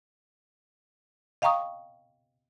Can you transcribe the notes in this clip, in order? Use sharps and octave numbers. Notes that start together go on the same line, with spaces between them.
D#5 F5 G5 A#5 C#6 D#6